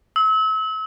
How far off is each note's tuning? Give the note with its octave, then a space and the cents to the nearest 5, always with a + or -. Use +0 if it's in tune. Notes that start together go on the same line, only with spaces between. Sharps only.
E6 -35